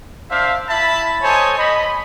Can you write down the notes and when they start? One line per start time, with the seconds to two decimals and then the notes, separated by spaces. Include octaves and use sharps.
0.31 D4 C5 E5 F5
0.69 E4 E5 A5 B5
1.23 A4 C5 C#5 D#5 G#5 A5
1.59 D#5 B5